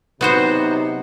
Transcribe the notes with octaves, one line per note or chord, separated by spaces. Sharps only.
C3 F#3 B3 D#4 F#4 C5